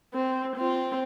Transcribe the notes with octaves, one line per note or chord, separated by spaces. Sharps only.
C4
C4 F4